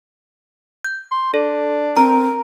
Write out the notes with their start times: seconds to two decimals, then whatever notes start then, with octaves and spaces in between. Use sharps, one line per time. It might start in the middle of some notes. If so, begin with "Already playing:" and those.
0.85 G6
1.12 C6
1.34 D4 A4
1.97 C4 A#4 A#5